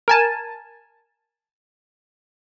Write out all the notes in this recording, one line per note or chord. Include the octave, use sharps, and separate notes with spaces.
A#4 G#5 A5